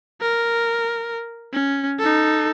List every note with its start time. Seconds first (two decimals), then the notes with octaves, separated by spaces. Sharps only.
0.21 A#4
1.53 C#4
1.99 D#4 A4